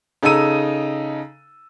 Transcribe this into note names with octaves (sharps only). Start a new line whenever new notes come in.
C#3 D#4 A4 A#5 E6 D#7